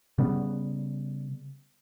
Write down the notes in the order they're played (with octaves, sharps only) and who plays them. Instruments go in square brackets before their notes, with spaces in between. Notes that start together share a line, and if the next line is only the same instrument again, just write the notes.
[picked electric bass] C#3 G3 B3